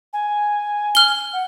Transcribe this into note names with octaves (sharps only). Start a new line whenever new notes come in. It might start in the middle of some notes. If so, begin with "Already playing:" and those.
G#5
F6 G7
F#5